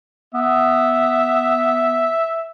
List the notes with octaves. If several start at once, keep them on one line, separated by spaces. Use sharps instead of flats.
B3 E5